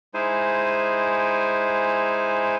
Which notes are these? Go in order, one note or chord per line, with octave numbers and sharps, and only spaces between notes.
G#3 D#4 E4 C5 G#5